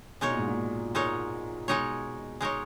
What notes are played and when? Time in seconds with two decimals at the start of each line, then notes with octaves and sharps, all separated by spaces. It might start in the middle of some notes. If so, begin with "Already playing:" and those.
0.21 B2 G#3 D#4 A#4 C#5
0.30 A#2
0.39 G#2
0.48 A#2
0.95 G#3 D#4 A#4 C#5
1.68 B2 G#3 D#4 A#4 C#5
2.41 G#3 D#4 A#4 C#5